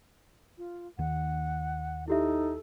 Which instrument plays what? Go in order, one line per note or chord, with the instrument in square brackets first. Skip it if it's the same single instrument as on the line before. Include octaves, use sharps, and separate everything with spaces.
[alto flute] F4
[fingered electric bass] D#2 D#3 [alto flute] F#5
[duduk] D#4 [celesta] E4 G4 E5 [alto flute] A4